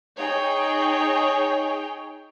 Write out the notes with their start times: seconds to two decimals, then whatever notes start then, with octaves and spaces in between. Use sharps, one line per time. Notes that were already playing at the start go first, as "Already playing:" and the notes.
0.18 D#4 G#4 C#5 G5